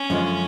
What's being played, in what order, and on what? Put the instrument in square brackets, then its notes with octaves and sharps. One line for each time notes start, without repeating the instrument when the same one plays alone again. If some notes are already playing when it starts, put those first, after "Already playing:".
Already playing: [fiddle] C#4
[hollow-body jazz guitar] F#2 D3 F3 G#3